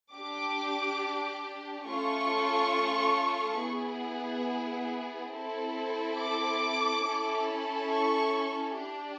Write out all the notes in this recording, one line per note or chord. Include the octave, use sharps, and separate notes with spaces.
D4 G4 D6
A3 C#4 F4 A4 C#6
B3 E4 G#4
C4 E4 A4
D6
C#4 E4 A4
C#6
D4 G4